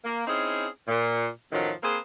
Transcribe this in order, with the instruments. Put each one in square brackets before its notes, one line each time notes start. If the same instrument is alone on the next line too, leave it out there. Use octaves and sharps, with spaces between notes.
[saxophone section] A#3
C4 C#4 D#4 E4 G#4
A#2
F#2 A2 D#3 F3 F#3
A#3 C4 G#4 B4 C5